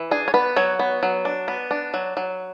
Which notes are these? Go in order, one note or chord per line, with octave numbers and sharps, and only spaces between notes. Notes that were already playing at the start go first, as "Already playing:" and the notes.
Already playing: E3
D4 G#4
C#5
B3 B4
F#3 C#5
B3
F#3
D4
B3
D4
F#3
F#3